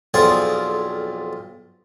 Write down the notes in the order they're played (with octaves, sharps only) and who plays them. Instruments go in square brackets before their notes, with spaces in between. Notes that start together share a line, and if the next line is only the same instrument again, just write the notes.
[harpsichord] B1 F2 F4 G#4 D5 F#5